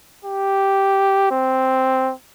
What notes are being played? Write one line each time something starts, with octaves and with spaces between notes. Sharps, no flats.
G4
C4